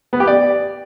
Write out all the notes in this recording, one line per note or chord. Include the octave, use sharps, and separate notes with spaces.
B3
G4
D5